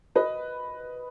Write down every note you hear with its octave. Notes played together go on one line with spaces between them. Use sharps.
B4 D#5